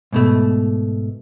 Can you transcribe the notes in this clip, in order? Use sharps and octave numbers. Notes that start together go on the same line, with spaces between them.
G#2 B2 A3